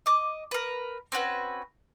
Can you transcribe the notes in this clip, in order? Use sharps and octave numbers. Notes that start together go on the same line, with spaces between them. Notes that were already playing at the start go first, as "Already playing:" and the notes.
D#5 D6
A#4 B4
C4 C#4 F#4 B4